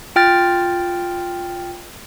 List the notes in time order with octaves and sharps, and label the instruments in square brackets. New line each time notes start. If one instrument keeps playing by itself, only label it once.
[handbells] F4 G5 F6 A6